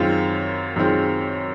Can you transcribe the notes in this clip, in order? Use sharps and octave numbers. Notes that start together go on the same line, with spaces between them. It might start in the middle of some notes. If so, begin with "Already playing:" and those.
Already playing: F#2 D#3 G#3 C4 F4
F#2 D#3 G#3 C4 F4